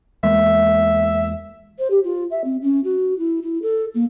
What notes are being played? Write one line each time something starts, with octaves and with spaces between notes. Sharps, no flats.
E2 G#3 A#3 E5
C5
G4
F4
E5
C4
C#4
F#4
E4
E4
A4
A#3